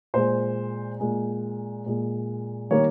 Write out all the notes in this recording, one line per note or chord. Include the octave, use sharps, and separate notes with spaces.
A#2 G#3 C5
A#2 G#3
A#2 G#3
D#3 G3 A#3 C#5